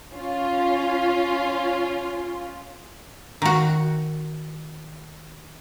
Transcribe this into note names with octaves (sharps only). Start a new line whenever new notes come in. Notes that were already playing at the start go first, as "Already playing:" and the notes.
C#4 F4
D#3 F#4